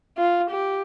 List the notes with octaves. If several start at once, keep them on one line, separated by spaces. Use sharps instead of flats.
F4
G4